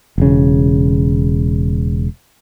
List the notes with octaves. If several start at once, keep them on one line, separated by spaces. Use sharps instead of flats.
E1 C#3